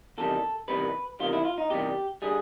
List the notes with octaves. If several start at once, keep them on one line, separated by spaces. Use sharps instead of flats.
E2 C3 D#3 G3 A4
E2 C3 D#3 G3 B4
E2 C3 D#3 G3 F4
E4
F4
D#4
E2 C3 D#3 G3 G4
D3 G3 G#4